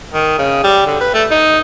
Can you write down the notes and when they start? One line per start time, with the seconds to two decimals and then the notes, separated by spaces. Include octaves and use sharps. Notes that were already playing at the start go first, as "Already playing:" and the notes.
0.13 D#3
0.39 C#3
0.64 G3
0.86 D3
1.01 B4
1.14 A3
1.31 D#4